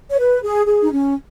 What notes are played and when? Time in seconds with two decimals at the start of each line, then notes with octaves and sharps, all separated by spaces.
0.10 C#5
0.18 B4
0.43 G#4
0.66 G#4
0.83 D#4
0.92 C#4